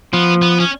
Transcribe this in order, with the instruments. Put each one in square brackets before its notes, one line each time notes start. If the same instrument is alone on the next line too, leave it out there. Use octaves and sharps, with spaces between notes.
[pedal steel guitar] F3 [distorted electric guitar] B3
[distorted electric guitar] B3
C#4